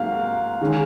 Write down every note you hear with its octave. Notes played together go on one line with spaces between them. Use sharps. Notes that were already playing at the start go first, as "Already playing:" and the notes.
Already playing: G#2 F#3 A#3 F5
D#3 G#3 C#4